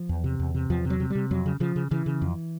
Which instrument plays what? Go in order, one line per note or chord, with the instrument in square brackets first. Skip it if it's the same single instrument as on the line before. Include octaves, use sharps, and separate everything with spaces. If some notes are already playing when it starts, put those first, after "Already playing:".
Already playing: [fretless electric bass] F3
E2
C3
E2
C3
E2 F3
C3
F#3
C3
G3
C3
F2 F#3
C#3
C#3 F3
C#3
C#3 E3
C#3
F2